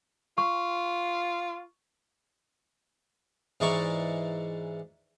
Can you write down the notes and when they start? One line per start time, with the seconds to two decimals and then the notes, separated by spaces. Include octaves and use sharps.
0.38 F4 C#6
3.60 G#2 E3 G#3 D5 A#5 C#6